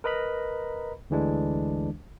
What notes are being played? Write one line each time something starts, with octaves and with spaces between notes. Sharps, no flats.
A#4 B4 D#5 A#5 B5
D2 D3 E3 G#3 D4